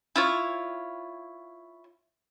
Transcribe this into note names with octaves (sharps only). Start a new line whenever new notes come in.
E4 F4 C#5